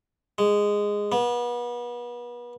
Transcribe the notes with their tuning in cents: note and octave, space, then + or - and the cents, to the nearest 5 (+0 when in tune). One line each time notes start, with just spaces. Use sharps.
G#3 -10
B3 -35